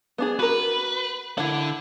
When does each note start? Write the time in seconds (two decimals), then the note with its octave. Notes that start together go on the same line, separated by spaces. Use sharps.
0.18 B3 D4 G#4
0.39 F#4 A#4 B4
1.38 D3 E4 A4 F#5